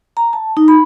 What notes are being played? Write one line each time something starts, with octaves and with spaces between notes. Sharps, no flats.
A#5
A5
D#4
B5